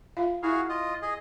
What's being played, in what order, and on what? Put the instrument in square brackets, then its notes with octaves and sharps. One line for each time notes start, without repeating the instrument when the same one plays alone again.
[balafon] F4 E5 F5
[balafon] E4 E5 [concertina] F#4 G#4 F5
[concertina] F4 D#5
G#4 D#5